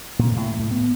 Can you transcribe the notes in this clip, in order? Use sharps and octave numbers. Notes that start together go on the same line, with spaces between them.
A#2
A2
A2
B3